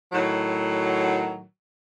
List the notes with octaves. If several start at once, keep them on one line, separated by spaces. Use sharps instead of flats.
A2 D#3 F#3